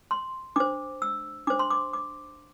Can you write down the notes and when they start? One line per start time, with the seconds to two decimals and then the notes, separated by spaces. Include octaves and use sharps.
0.11 C6
0.56 D4 C5 D6
1.02 E6
1.47 D4 C5 D6
1.59 C6
1.70 D6
1.93 D6